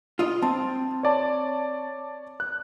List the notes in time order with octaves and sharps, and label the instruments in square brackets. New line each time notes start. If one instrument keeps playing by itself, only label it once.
[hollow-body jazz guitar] F4 D#5
[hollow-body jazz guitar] C4 [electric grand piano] A5
[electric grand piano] C#5 D5 A5
F#6